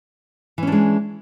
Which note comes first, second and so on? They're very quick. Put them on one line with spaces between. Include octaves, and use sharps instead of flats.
E3 C#4 D4 G#3